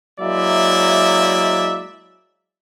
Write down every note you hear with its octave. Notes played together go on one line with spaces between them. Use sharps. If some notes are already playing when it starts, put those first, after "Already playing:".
F#3 G#3 A#3 E4 D5 E5